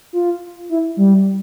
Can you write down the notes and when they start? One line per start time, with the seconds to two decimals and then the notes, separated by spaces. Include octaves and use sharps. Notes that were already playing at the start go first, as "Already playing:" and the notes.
0.13 F4
0.69 E4
0.97 G3